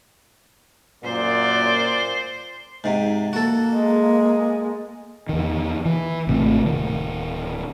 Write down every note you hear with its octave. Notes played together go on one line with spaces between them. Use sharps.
F#2 A#2 C5 D5
G#2 C3
A#3 F#4 A4
G#3
E2 D#3
E3
G#1 C3 E3 A3
D1 D#3